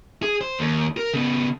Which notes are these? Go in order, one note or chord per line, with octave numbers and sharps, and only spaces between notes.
G#4
C5
D#2
A#4
C#3 B3